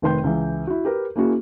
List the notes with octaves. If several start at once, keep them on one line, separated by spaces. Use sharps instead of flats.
F1 D#3 B4 G5 C6 G6
C#2 E3
E4 F#4
G4 A#4 B4
A#3 C#4 E4 F#4 G#4